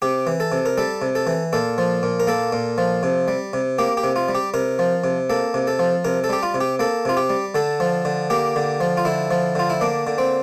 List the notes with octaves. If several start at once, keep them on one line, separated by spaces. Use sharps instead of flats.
C3 G4
E3
A4
C3
A#4
G3 A4
C3
A4
E3
A#2 A4
F3
A#2
A#4
A#3 A4
A#2
F3
C3
G3
C3
A#3 G4
G4
C3
F4
G3
G4
C3 A#4
F3
C3
A#3 A4
C3
A4
F3
C3 A#4
A4
G3 G4
F4
C3
G4
A#3 A4
C3 F4
G4
G3
D3 A4
F3
D3
A#3 G4
D3
F3
F4
D3 E4
F3
D3 F4
E4
A#3 D4
D3
C4